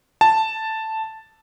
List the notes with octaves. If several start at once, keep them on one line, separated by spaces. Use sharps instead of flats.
A5